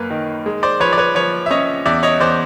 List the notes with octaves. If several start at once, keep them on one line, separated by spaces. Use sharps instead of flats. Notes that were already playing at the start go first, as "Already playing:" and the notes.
Already playing: F#2 A#3 B4
D#3
G#3
C5 D5
F3 B4 C#5
D5
B4 C#5
F3 B4 C#5
E5
C#4 C#5 D#5
E2 D5 E5
C#5 D#5
E2 C5 D5